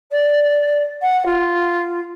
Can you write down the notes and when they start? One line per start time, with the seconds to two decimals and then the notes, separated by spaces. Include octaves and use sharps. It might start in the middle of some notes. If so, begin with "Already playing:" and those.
0.11 D5
1.01 F#5
1.25 F4